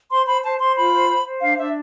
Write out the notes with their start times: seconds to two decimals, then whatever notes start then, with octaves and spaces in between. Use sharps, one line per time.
0.10 C5 C6
0.26 C5 B5
0.43 C5 A5
0.59 C5 C6
0.75 F4 B5
0.92 C5
1.08 C5
1.25 C5
1.41 D4 F5
1.57 D4 E5